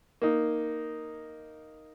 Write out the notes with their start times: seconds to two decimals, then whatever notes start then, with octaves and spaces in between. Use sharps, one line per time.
0.22 A#3 D#4